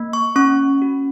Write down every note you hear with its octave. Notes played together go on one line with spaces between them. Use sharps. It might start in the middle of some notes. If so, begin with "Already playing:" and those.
Already playing: A#3
C#6
C#4 C#6
F#4